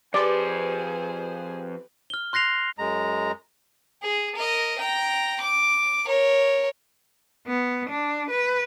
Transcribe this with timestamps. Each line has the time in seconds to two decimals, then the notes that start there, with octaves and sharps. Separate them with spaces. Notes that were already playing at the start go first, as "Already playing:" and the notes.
0.14 F2 G4 G#4 B4 C5 D5 C6
2.10 F6 G7
2.33 C6 F#6 A#6 C7 F7
2.78 F#2 G#3 A#5
4.02 G#4
4.35 A#4 D#5
4.79 G5 A#5
5.41 D6
6.06 A#4 C#5
7.47 B3
7.89 D4
8.30 B4